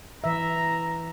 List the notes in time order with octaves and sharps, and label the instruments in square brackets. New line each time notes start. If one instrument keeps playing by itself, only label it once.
[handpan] E3 E5 [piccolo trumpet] A#5